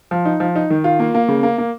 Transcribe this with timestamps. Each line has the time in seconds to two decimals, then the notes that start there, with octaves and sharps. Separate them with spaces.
0.11 F3
0.25 D#4
0.40 F3
0.56 D#4
0.70 D#3
0.84 F4
0.99 A#3
1.14 A#3
1.28 C#3
1.43 A#3
1.58 A#3